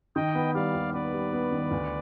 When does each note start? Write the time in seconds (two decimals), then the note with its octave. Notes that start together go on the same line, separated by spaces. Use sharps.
0.16 D#3 D#5 G5
0.35 B3
0.55 G3 D5 F5
0.74 D#2
0.93 B3 B4 D5
1.13 G3
1.33 B3
1.52 D#3
1.71 D2